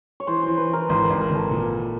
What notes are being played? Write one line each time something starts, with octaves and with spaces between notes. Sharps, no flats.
C#5
E3 C5
E3 C5
B4
E3 A#4
G#1 C5
B4
G#1
A#4
G#1 A4
A#2